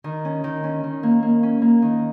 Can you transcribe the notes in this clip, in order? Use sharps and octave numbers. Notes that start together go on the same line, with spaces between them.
D#3
C#4
D#3
C#4
D#3
A#3
A#3
C#4
A#3
D#3